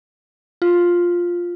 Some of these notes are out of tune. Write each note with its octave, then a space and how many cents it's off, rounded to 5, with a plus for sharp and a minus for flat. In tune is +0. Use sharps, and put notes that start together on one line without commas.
F4 +5